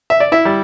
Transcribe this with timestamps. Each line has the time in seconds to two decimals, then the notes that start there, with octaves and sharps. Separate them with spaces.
0.10 E5
0.20 D5
0.32 E4 E5
0.45 G3